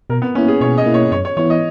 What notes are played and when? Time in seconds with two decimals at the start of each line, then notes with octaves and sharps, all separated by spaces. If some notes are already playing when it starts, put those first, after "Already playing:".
0.10 B2 A#4
0.22 B3
0.35 A#3 C#4 E4
0.48 G#4
0.61 B2 C#5
0.78 D#5
0.86 A#3 E4
0.94 C#5
1.11 F#2 C#5
1.25 C#5
1.37 E3 B3 E4 C#5
1.50 D#5